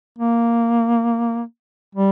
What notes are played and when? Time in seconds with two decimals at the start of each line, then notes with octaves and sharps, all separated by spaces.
0.18 A#3
1.95 G3